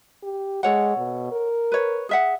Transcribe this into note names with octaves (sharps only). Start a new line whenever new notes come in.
G4
G#3 A4 C#5 F#5
B2
A#4
B4 C#5
G#4 E5 F#5